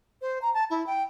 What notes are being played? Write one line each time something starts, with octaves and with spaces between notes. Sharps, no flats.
C5
A#5
A5
E4
G5